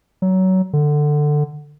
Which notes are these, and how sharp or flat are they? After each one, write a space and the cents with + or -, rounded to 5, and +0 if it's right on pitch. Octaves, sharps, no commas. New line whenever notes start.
F#3 +20
D3 +15